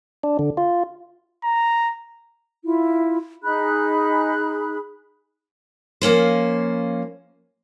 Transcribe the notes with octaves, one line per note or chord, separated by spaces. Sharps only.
D4
D3
F4
A#5
E4 F4
D#4 G#4 B5 F#6
F3 A#3 C#4 C5